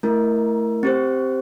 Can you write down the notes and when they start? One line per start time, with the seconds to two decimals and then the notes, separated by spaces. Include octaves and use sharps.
0.03 A3 E4 A#4
0.83 C4 G4 C5